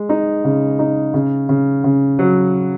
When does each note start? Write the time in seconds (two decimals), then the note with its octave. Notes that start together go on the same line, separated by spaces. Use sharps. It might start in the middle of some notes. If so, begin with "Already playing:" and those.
Already playing: G#3
0.09 D#4
0.44 C#3
0.79 D#4
1.14 C#3
1.49 C#3
1.84 C#3
2.19 F#3